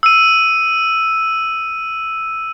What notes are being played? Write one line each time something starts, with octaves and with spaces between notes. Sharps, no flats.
E6 D#7